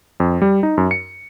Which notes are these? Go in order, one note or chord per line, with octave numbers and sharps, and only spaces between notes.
F2
G3
D#4
F#2
C#7